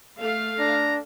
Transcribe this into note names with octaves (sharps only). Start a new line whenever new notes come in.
A3 F5
D4 A#5